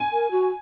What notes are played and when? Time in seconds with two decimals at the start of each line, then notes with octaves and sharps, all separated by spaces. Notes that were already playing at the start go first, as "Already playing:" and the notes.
Already playing: G#5
0.13 A#4
0.31 F#4